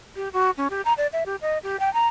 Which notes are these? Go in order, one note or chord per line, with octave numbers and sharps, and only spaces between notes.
G4
F#4
C#4
G4
A#5
D5
E5
G4
D#5
G4
G5
A#5